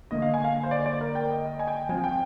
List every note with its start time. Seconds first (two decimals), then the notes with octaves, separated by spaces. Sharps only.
0.11 D3 F3 A#3 D4 D#5
0.22 F5
0.34 G#5
0.44 F5
0.63 C5
0.71 D5
0.86 D5
1.01 A#4
1.15 G5
1.30 D#5
1.45 D#5
1.59 G#5
1.67 G5
1.89 F3 C4 G#5
2.04 G5